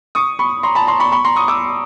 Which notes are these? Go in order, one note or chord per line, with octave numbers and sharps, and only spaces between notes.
C#6 D#6
B5 C#6
A#5 C6
A5 B5
A#5 C6
B5 C#6
B5 C#6
A#5 C6
C#6 D#6
D6 E6